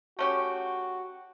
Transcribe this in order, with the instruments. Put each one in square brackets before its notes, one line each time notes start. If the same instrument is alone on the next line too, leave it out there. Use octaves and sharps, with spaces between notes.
[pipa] A3 C#4 G4 [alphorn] F#4